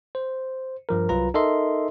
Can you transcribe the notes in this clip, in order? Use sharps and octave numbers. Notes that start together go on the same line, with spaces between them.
C5
G2 F3 A#4
C2 F#3 F4 B4 A#5
D#4 A4 A#4 D#5 E5 C6